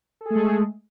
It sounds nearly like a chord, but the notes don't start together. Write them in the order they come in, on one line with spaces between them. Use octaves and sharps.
A4 G#4 A3 G#3